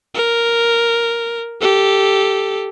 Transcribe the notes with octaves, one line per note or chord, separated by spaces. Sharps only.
A#4
G4 A4